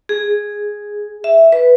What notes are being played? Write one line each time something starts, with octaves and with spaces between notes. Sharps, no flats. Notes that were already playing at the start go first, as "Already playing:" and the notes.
G#4
E5
B4